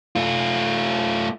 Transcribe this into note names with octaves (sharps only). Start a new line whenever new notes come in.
A3 F4